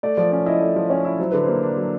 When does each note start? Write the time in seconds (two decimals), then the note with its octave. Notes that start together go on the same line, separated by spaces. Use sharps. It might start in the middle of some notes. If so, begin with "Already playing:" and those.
0.03 A3 D5
0.17 F3 D5
0.31 C#4 D5
0.46 E4 D#5
0.60 A3 D5
0.76 F3
0.90 C#4 C#5
1.05 E4
1.19 F#3 C5
1.32 D3 B4
1.43 C5
1.48 A#3
1.63 D4
1.77 F#3